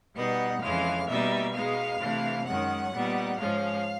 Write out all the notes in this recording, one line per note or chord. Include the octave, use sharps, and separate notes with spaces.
B2 G3 B3 D#4 F#5
F2 C#3 E3 G#3 F5
B2 G3 A#3 D#4 E5
B2 G#3 B3 D#4 F5
C3 E3 A3 D4
F#2 D#3 G#3 C#4 F#5
A#2 G3 B3 D#4
G#2 F3 G#3 C#4 F5